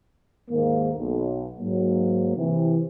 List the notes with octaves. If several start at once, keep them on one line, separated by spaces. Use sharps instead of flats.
D#2 G#2 G#3 A#3
B1
G#2 F#3 A#3
C3 E3